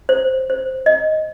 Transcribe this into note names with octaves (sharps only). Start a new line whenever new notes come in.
C5
C5
D#5